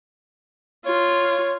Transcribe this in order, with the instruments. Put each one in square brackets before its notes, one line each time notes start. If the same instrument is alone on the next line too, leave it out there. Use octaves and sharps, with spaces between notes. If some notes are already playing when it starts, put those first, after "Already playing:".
[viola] F4 [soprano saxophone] C#5